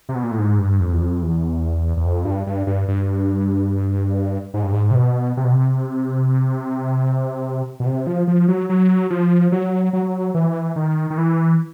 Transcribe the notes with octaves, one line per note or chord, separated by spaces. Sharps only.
C3
B2
A#2
A2
G#2
G2
F2
E2
F2
E2
E2
F2
G2
G2
G2
G2
G#2
G2
G#2
C3
B2
C3
B2
C3
B2
C3
F3
F3
F#3
F#3
F3
F#3
F#3
E3
D#3
D#3
E3